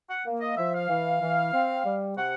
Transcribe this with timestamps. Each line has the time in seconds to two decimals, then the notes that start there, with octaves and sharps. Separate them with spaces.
0.09 F#5
0.26 A#3
0.41 D#5
0.57 F3 E5
0.74 F5
0.89 E3
1.22 E3
1.53 C4
1.85 G3
2.17 C3 F#5